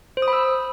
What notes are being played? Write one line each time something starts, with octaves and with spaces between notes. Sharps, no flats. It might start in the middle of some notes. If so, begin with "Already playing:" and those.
C5
D#6
B5
E6